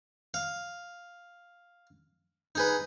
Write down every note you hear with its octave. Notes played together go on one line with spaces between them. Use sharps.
F5
D#4 G#4 B4